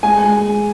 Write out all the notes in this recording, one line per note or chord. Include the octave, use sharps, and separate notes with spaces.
G#3 G#5
G#3